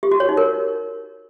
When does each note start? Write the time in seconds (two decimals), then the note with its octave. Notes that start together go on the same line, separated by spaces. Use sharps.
0.03 G4
0.11 F#4
0.20 C#5
0.29 D#4
0.37 A#4